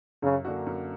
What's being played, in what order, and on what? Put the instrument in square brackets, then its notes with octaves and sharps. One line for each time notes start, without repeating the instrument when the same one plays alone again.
[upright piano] F#2 [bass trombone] C#3
[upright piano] D3 A#3 D4 F#4
F#2